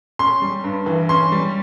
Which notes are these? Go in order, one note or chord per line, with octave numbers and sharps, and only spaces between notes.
C#4 C6
G3
G2
E3
C#4 C6
G3